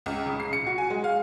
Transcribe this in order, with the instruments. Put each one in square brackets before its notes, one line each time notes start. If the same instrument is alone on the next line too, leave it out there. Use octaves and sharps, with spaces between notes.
[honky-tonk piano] C#2
C#3
C7
C#7
F#4
G#5
G#3
F5